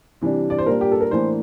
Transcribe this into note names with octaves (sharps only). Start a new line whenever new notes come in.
C3 E3 G3 D4
D5
C5
A#2 G3 D4 A#4
G4
A4
A#4
A2 E3 A#3 D4 C5